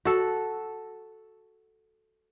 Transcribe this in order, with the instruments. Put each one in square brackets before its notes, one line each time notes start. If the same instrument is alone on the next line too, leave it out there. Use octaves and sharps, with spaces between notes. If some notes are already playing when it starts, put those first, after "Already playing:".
[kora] F#4 A4